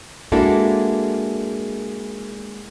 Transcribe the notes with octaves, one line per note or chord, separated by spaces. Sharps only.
G#3 A#3 D4 E4 F#4 A4